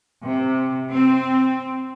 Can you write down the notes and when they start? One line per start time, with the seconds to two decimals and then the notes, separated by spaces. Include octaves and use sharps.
0.24 C3
0.90 C4